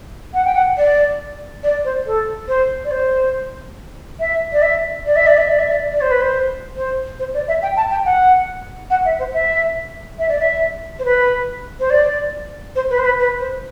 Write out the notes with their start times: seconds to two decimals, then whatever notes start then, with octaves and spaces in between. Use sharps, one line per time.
0.34 F#5
0.45 G5
0.55 F#5
0.77 D5
1.63 D5
1.85 C5
2.06 A4
2.48 C5
2.84 D5
2.91 C5
4.20 E5
4.52 D5
4.62 E5
5.06 D5
5.16 E5
5.27 D5
5.37 E5
5.48 D5
5.59 E5
5.70 D5
5.91 D5
6.01 C5
6.11 B4
6.21 C5
6.77 C5
7.19 C5
7.34 D5
7.48 E5
7.62 G5
7.77 A5
7.91 G5
8.05 F#5
8.90 F#5
9.05 E5
9.19 C5
9.33 E5
10.19 E5
10.29 D5
10.39 E5
10.99 C5
11.05 B4
11.80 C5
11.90 D5
12.76 C5
12.90 B4
12.98 C5
13.05 B4
13.19 B4
13.40 C5